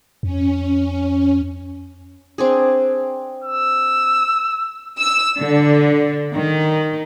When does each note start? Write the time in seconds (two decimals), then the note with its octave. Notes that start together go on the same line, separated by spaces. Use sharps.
0.23 F2 C#4
2.38 C4 D4 G#4
3.44 E6
4.99 E6
5.39 D3
6.34 D#3